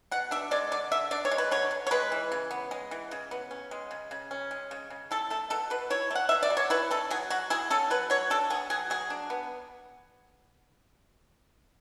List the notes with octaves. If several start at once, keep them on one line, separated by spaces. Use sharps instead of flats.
B2 F#5
D4 E5
G#3 D5
D3 D5
D3 E5
D4 D5
C#5
G#3
B4
D3 C#5
D3
C#5
G#3 B4
E3
C#3
B3
G#3
E3
C#3
B3
C#4
G#3
C#3
C#3
C#4
G#3
C#3
C#3
E4 A4
A3 A4
B2 A4
B2 B4
E4 C#5
A3
F#5
B2 E5
D5
B2
C#5
E4 B4
C#4 A4
F#3 G#4
F#3 F#4
E4 G#4
C#4 A4
F#3 B4
F#3 C#5
D4 A4
B3 G#4
F#3 G#4
F#3 G#4
D4
B3